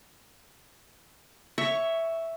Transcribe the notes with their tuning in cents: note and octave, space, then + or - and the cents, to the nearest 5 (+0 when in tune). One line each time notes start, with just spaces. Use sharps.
C#5 +0 E5 +0 C#6 +15